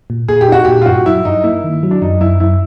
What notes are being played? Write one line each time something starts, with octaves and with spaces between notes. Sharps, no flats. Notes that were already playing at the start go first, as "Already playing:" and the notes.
A#2
A#2 G#4
G4
D#4 F#4
A#2 G4
F4
G2 F#4
F#3 E4
G2 D#4
A#3 E4
D#3
F#3
D4
F#2 D#4
F#2 E4
F#2 E4